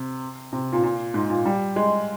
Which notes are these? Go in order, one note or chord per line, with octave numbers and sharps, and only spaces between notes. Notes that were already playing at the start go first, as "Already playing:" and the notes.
Already playing: C3
C3
A#2
A#2
G#2
A#2
G3
G#3